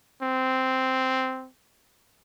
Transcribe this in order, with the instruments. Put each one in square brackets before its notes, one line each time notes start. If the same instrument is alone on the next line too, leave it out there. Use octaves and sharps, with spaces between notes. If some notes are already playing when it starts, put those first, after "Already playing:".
[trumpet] C4